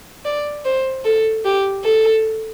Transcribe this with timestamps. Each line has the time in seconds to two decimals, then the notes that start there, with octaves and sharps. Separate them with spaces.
0.25 D5
0.65 C5
1.05 A4
1.45 G4
1.84 A4